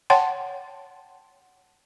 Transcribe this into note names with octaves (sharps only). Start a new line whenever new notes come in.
C#5 F#5 G5 A5 C6